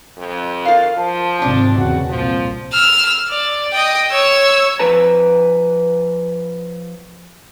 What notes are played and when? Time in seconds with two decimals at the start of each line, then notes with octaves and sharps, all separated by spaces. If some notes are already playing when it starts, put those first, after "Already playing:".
0.18 F2
0.65 F4 A#4 F5
0.97 F3 A5
1.42 G#1 C3 C4 D4
1.77 E2 C#3 F#4
2.09 C2 A#2 F3 C4
2.73 E6 F6
3.29 D5
3.73 D#5 G5
4.11 C#5 E6
4.79 F3 B4 A#5